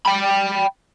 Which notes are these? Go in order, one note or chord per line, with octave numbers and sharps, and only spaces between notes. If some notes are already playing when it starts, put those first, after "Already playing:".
G5 B5